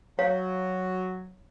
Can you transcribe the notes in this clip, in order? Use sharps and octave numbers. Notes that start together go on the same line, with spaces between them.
F#3 C#5 F5